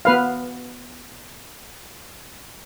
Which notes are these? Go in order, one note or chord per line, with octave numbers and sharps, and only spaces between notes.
B3 B4 F5